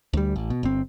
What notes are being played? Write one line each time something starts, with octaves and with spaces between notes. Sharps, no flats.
D2 G3
A1
B2
G1 C4